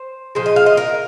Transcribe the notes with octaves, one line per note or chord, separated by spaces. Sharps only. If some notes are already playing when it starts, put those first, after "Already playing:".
Already playing: C5
A#2 F3 G#3 C5
D#5
F5
D#5
A#4